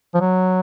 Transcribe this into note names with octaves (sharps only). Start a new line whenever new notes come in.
F3
F#3